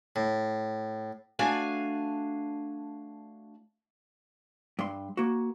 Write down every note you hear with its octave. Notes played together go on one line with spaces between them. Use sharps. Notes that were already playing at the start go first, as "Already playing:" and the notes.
A2
A3 D4 F#4 F5 G#5
G2 C6
A#3 F#4